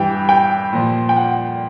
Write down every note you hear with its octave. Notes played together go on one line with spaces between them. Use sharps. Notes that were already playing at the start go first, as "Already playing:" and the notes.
Already playing: G2 E3 G5
G5
A#2 F3
G5
F#5